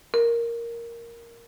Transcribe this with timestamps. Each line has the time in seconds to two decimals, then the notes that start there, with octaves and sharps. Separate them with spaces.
0.14 A#4